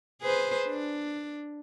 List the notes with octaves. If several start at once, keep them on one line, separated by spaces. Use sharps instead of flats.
G#4 B4 C5
D4